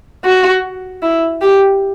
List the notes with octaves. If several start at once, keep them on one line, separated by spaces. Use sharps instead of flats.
F#4
E4
G4